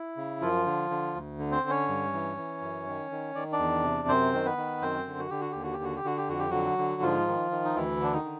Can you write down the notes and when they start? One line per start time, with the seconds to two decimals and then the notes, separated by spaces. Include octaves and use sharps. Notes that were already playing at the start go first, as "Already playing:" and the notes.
Already playing: E4
0.17 C#3
0.41 F#2 F3 F4
0.66 D3
0.90 D3
1.15 D2
1.39 D3
1.51 C4 C5
1.63 D3
1.70 C#4 C#5
1.88 G2
2.13 E3
2.37 E3
2.62 F#2
2.86 D#3
3.11 D#3
3.35 D#3 D5
3.52 D4 D5
3.59 E2
3.84 C3
4.08 F#2 C4 C5
4.34 D#3
4.45 B3 B4
4.58 D#3
4.81 F#2 C4 C5
5.07 D3
5.19 F#4
5.30 D3 G4
5.41 F#4
5.52 D#2 G4
5.63 F#4
5.74 G4
5.79 D3 F#4
5.96 G4
6.04 D3 F#4
6.18 G4
6.29 F2 F#4
6.39 G4
6.50 D3 F#3 F#4
6.78 D3
7.02 G#2 F3 F4
7.27 D#3
7.51 D#3
7.65 D#4
7.75 D2 E3 E4
8.00 D3 D4
8.13 D#3 D#4
8.25 D3